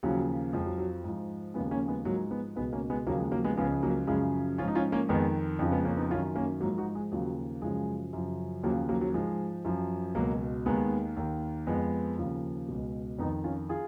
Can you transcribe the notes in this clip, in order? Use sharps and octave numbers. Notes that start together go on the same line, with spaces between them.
D#2 C#3 F3 F#3
F2 F3 G#3
F#3
F#3
G#2 F3
D#2 C#3 F3 G#3 B3
A#3 C#4
G#3 B3
G#2 F3 F#3 A#3
G#3 B3
C#2 B2 G#3 B3
A#3 C#4
G#3 B3
D#2 C#3 F3 F#3 A#3
G#3
F#3 A#3
G#3 B3
C#2 C#3 F3 G#3 B3
F#3 A#3
F#2 C#3 F3 G#3
G#2 F3 C#4 F4
D#4
C#4 F4
A#3 C#4
F2 D#3 G#3 B3
F2 C#3 F3
G#3 B3
A#3 C#4
B3 D#4
F#2 D#3 C#4 F4
A#3 C#4
G#2 F3 F#3 A#3
D#4 F#4
G#3
D#2 C#3 F3 F#3
F#2 C#3 F3 G#3
F#2 C#3 F3
D#2 C#3 F3 F#3 A#3
F#3 A#3
F#3
G#2 F3 G#3
F#2 F3
C#2 B2 F#3 A#3
D#2 D#3 G#3 B3
D#2 D#3
F2 F3 G#3 B3
D#2 C#3 F3
C#2 B2
F2 D#3 B3 D#4
C#4 F4
F4 G#4